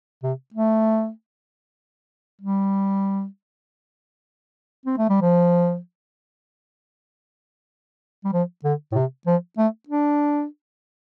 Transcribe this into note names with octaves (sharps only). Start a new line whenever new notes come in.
C3
A3
G3
C4
A3
G3
F3
G3
F3
D3
A2
C3
F3
A3
D4